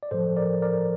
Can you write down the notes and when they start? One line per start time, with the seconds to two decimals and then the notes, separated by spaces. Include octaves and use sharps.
0.03 D5
0.11 A2 F3 A4 C5
0.36 A#4 D5
0.62 A#4 D5